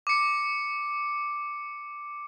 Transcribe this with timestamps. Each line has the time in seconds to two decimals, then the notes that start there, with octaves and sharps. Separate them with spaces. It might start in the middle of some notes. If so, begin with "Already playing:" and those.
0.07 D6 C#7